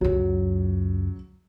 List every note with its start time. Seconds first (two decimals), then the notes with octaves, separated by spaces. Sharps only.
0.01 C#2 F#2 F#3